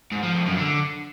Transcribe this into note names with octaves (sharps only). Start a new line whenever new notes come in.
G#2
F3
F2
F#2
D3